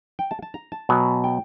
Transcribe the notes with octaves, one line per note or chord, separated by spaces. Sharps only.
G5
A5
A5
A#5
A5
B2 F#3 B3 G#5
G5